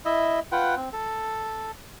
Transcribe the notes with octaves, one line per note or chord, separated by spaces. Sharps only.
E4 D#5 E5
F4 B4 F#5 G5
C4
A4